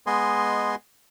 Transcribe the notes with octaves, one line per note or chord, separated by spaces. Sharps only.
G#3 B3 D#5 G#5 C6